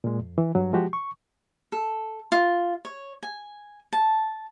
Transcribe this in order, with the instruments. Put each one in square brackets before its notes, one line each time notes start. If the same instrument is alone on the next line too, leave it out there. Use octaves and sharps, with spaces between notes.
[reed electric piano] A#2 G#3
F2
E3
G2 F#3
F3 G#3 F#4 G4
C#6
[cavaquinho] A4
F4
C#5
G#5
A5